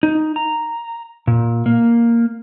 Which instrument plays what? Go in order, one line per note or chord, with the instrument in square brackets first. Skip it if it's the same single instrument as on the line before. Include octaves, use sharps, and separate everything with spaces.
[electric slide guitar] D#4
A#5
A#2
A#3